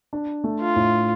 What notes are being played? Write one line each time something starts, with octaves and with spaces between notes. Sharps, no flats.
D4
A3
F4
A2